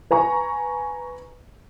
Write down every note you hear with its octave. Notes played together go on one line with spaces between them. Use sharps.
B4 G#5 A#5 C#6